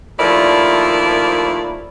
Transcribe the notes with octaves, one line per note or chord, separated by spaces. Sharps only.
D#2 F3 A3 E4 A#4 D5